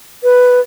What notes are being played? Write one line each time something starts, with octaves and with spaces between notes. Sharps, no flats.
B4